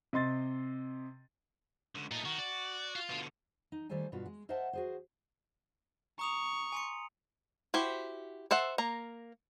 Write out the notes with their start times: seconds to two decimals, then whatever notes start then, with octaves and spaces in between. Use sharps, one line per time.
0.13 C3 D#5 C6 A6
1.95 C#2 D3
2.11 A#2 A3 D#4
2.25 D#3 F#4
2.39 D5
2.96 F4
3.10 B2 D3
3.72 D#4
3.89 D#3 G3 A3 A4 C5 G#5
4.12 G2 B2 F4 F#4 B4
4.26 G#3
4.49 A#4 C5 D#5 E5 F#5 A5
4.73 F#4 G#4 C5
6.19 A#5 C#6 D#6 F7
6.72 G#5 C6 C#7
7.74 E4 F#4 G4 C5
8.51 A4 C5 E5 F#5
8.78 A#3 A#5